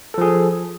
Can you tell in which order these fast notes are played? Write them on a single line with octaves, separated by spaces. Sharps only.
A4 F3 G#4